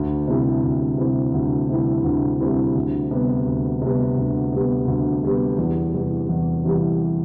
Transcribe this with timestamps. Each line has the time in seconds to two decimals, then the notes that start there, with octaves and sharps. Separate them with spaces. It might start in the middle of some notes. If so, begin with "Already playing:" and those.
Already playing: D2
0.28 C3 G3 C4 E4
0.63 D2
0.98 C3 G3 C4 E4
1.33 D2
1.69 C3 G3 C4 E4
2.04 D2
2.40 C3 G3 C4 E4
2.75 D2
3.11 C3 G3 B3
3.46 D2
3.82 C3 G3 B3
4.17 D2
4.52 C3 G3 B3
4.87 D2
5.23 C3 G3 B3
5.58 E2
5.94 C3 E3 G3
6.29 E2
6.65 C3 E3 G3